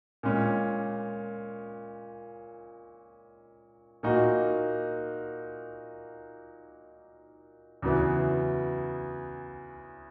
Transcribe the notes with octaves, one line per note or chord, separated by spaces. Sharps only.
A#2 G#3 C#4
A#2 A#3 D#4 F#4
E2 C#3 F#3 B3 E4